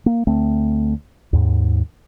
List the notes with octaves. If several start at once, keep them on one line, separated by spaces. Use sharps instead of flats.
A#3
D2 A3 C4
D#2 G#2